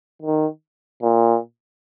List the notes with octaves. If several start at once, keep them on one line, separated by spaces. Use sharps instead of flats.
D#3
A#2